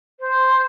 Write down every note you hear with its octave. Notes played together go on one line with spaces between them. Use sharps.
C5